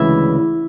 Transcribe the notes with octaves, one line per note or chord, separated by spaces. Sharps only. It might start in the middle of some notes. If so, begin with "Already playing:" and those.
Already playing: D2 C#3 E3 G#3 E4